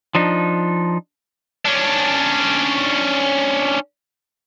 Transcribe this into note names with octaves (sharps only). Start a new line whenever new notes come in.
F3 D4 D#4
C#4 D4